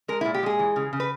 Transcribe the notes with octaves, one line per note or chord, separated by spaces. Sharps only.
G#3 A#4
E4
A#2
G4
G#3 G#4
E3
C#3
C#3
B4